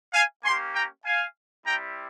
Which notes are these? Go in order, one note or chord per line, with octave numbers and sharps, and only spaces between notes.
F5 G#5
A#3 C#4 G4 G#5 C6
G5 A#5
F5 G#5
G3 C4 E4 G4 G5 A#5